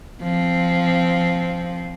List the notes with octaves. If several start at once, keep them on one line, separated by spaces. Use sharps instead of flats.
F3 C4